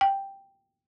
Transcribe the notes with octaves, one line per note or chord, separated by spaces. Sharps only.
G5